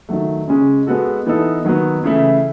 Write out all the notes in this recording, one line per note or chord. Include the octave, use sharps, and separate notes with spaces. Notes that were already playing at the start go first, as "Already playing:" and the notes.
D#3 F#3 A3
C#3 G#3 C#4
G#3 B3 F#4 A4
E3 B3 D#4 A4
D#3 F#3 B3
C#3 E3 A3 E4